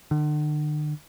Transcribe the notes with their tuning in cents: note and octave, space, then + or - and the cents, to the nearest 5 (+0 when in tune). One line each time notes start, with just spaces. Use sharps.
D3 +45